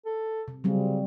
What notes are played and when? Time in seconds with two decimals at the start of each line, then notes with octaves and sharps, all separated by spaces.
0.05 A4
0.48 C3
0.64 C#3 F#3 G3 C4